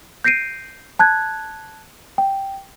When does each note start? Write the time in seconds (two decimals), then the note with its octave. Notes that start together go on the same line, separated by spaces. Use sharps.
0.24 G6 A#6 C7 D7 D#7
0.99 A5 F#6 G#6
2.18 G5